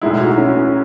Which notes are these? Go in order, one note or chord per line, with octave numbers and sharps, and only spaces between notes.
B1 A2 G#3 D#4 E4
F#4
C#4